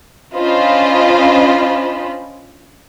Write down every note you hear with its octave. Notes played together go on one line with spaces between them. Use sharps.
C#4 D4 F4 C5 D#5 B5